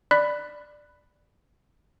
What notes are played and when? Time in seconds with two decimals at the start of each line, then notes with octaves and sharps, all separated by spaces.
0.11 D5 B5 F#6 B6